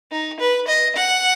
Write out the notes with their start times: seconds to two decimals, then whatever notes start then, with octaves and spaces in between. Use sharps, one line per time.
0.12 D#4
0.40 B4
0.68 D#5
0.96 F#5